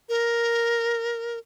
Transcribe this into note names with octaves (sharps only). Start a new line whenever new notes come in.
A#4